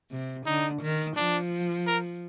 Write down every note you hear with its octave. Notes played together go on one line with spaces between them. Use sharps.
C3
D3 D#4
D#3
F3 D4
A#4